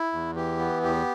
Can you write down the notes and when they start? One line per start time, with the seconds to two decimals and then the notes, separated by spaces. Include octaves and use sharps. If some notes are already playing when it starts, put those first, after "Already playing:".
Already playing: E4
0.12 E2
0.35 E3 G4
0.59 B3
0.83 E2 G4